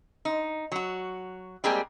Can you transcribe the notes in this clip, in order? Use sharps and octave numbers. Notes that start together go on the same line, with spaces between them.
D#4
F#3 F#4
G3 G#3 A#3 C4 G4 G#4